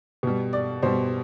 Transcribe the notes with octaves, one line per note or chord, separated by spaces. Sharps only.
B2 G3
D5
B2 G3 C5